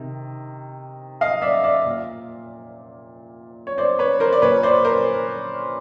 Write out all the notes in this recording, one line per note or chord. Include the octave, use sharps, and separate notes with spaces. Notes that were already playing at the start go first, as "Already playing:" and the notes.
Already playing: C3 D#3
D#5 F5
D5 E5
D5 E5
A#2
C#5
C5 D5
B4 C#5
A#4 C5
D5
A#2 B4 C#5
C5 D5
A#4 C5